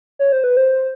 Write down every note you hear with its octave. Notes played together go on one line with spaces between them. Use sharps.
C#5
C5
B4
C5